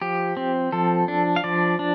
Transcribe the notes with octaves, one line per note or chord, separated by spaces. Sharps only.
F3 G4
C4
F3 A4
D4
F5
F3 D5
D4